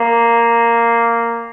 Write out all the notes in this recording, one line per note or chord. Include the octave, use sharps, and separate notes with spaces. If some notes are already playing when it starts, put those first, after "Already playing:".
Already playing: A#3